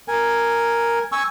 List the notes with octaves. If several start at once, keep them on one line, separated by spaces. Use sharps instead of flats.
A#4 G#5
G#5 C#6 E6